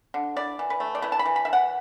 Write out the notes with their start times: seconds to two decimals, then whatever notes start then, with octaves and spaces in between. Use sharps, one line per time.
0.14 D3
0.36 E4 D5
0.59 E3
0.70 B4
0.80 A3
0.95 D5
1.02 E4 B4
1.12 A5
1.19 B5
1.25 E3
1.36 B5
1.45 E3 E5
1.53 F#5